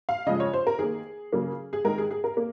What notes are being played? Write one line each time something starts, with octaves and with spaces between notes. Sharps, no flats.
F5
C#3 F3 G#3 D#5
C#5
C5
A#4
D#3 A#3 G#4
C#3 F#3 A#3
G#4
D#3 G#3 A#4
G#4
G#4
A#4
A#3